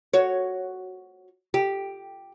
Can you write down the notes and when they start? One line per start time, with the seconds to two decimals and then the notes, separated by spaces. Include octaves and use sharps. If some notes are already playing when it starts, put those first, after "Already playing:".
0.14 F#4 C#5
1.54 G4